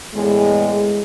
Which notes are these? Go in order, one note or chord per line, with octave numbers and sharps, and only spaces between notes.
E2 A2 G#3